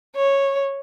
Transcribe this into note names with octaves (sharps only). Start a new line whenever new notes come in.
C#5